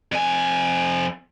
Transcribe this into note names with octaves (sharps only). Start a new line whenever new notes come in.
F2 G#5